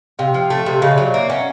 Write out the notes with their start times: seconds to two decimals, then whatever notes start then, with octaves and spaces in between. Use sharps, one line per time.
0.19 C3 F5 G5
0.34 F3
0.50 A3
0.66 C3
0.81 C#3 D#5 F5
0.92 D5 E5
0.98 F#3
1.03 C#5 D#5
1.14 A#3 D5 E5
1.29 C#4 E5 F#5